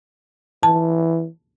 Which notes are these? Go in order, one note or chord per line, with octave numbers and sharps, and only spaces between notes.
E3 A5